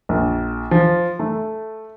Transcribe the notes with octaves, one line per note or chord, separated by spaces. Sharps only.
A#1
F3
A3